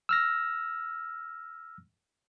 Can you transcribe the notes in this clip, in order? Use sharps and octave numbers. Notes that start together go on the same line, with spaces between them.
E6 F6 A#6